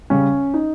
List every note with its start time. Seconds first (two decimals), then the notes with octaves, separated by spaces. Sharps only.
0.10 C#3 G3 C#4
0.54 D#4